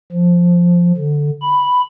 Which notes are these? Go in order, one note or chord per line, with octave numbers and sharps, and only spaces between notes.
F3
D3
B5